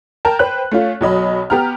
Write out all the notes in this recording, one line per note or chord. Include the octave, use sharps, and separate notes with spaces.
A#4 G5 A5
B4 C5 G5 F#6
A3 C#4 F4
B1 F#3 D#5 B5
B3 G4 A#5 F6